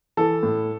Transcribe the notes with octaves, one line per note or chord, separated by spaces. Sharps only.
E3 A4
A2